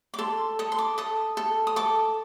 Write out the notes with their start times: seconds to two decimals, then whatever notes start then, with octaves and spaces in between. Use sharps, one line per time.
0.14 D6
0.19 A4 C6
0.59 A4 D#6
0.72 C6
0.78 D6
0.98 A4 D#6
1.37 A4
1.67 D#6
1.76 A4 D6